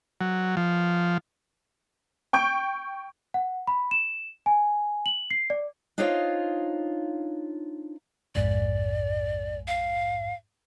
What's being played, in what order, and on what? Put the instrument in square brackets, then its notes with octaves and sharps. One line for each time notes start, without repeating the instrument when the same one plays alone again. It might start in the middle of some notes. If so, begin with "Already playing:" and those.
[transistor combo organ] F#3
F3
[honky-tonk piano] G5 C#6 G6 D7
[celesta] F#5
B5
E7
G#5
F#7
C7
D5
[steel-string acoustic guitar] D4 D#4 F4 C5 C#5 F5
[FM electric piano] A#1 F2 G#2 [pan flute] D5
[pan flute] F5